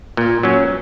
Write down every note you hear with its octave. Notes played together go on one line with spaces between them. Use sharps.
A#2
F#3 C#4